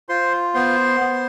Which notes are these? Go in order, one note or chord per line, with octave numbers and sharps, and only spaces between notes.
F4 C5 C6
B3 C5 C6
B3